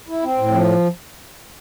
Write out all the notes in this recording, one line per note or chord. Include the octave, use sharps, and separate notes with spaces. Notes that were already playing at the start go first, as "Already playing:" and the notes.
E4
C4
A2
F3